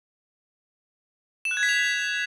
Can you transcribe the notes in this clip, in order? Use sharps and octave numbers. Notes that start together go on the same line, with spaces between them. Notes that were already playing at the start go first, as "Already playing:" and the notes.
E7
F#6
G#6
B6
F7